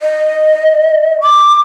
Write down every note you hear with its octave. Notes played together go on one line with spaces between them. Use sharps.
D#5
D6